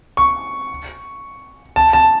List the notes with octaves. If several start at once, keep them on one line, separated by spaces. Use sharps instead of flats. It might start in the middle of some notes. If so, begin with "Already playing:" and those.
C#6
A5
A5